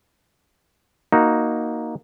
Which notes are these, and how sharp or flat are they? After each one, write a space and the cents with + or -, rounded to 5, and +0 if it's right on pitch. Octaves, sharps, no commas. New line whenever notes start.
A#3 +5 D#4 +0 F#4 +0